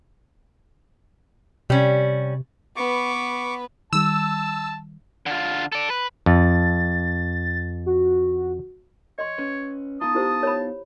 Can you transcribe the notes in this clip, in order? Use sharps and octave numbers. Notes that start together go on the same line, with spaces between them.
C3 G3 C#4
B3 B4 C#6 D6
D#3 G3 A5 E6
D3 F4
A4 D5
B4
F2 A6
F#4
C#5 D#5 C6
C#4 B4
B3 D#4 F4 A5 A#5 D#6
E4 G4 C5
C#5 B5